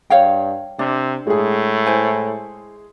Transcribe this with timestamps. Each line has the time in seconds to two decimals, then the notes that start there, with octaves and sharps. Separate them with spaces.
0.10 G2 C#5 F5 G5
0.79 C3 D4
1.27 A2 G#3 G#4
1.86 E4 C5 G#5